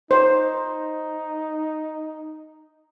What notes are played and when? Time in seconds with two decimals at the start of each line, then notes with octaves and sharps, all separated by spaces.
0.11 D#4 C5